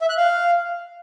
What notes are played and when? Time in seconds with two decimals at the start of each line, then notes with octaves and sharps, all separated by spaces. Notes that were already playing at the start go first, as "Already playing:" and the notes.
0.01 E5
0.09 F#6
0.17 F5